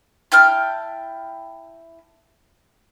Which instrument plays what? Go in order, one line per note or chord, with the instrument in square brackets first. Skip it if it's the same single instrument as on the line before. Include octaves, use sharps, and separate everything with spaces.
[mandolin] E4 G5 A5 F6